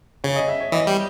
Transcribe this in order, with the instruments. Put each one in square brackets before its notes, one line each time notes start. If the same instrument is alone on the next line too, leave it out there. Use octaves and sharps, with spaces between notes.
[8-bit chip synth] C#3 [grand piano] C#5
[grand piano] D#5
E5
C#5
[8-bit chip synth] E3 [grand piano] D#5
[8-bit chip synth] G3